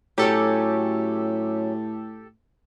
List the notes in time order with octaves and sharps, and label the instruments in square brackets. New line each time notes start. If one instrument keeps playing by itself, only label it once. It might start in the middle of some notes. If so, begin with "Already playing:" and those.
[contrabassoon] A2 [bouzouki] F#3 C#4 [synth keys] G4 A4